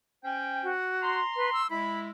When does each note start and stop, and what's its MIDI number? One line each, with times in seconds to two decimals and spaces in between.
0.24 0.71 61
0.24 0.71 72
0.24 0.71 79
0.63 1.20 66
1.01 1.62 82
1.01 1.62 84
1.36 1.50 71
1.53 1.67 88
1.70 2.11 56
1.70 2.11 64
1.70 1.99 83